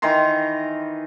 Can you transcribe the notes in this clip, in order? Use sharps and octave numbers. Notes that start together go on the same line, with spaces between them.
D#3 E3 A#5 C6